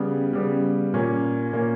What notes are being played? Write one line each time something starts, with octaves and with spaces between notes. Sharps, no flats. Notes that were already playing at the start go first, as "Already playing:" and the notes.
Already playing: C#3 G3 B3
C#3 G3 B3
A#2 A#3 C#4
A#2 A#3 C#4